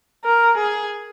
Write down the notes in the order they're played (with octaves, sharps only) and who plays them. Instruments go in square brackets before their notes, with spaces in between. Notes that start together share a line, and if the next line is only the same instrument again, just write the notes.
[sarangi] A#4
G#4